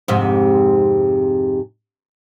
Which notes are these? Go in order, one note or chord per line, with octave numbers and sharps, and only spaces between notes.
F2 G#2 C3